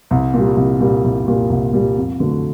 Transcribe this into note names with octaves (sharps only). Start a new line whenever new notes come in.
C2
A#2
G3
C2
A#2 G3
C2
A#2 G3
C2
A#2 G3
F2
D3 F#3 A3